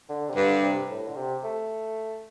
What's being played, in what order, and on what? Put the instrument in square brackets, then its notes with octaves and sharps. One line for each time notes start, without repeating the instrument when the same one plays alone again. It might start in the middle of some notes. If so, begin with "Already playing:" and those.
[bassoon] D3
C3
[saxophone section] G2 [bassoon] D3
[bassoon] C3
A2
D3
C3
A3